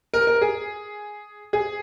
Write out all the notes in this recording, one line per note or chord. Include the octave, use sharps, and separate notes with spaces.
A#4
A#4
G#4
G#4